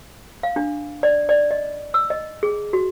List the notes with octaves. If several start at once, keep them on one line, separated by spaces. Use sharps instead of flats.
F5
D4
D5
D5
D#5
E6
D#5
G#4
F#4